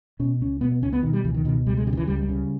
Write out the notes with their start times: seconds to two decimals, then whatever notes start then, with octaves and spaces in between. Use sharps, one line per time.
0.20 B2 C#4
0.41 C#2 C#4
0.61 B2 B3
0.72 B3
0.82 C#2 C#4
0.93 B3
1.03 B2 D#3
1.13 G3
1.24 C#2 E3
1.34 D#3
1.45 B2 D#3
1.66 C#2 G3
1.77 G#3
1.87 C#3 G3
1.93 D#3
1.97 E3
2.07 C#2 G3
2.19 G3
2.29 C#3